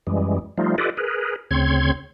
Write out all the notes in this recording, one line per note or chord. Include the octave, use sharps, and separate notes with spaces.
F#2 E3 G3 G#3
F3 G3 A3 D#4 F4
F4 G4 A4 B4 D5 D#5
G#4 A#4 B4
D2 C#3 C4 C#5 C6 G#6